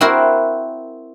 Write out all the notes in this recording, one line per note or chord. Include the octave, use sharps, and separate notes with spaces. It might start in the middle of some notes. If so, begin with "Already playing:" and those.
C4 E4 F#4 A#4 C5